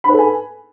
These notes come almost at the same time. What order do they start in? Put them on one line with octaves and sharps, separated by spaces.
B5 B4 A4 G#5